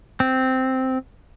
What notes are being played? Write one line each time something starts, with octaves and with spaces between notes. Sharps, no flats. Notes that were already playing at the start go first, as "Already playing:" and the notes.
C4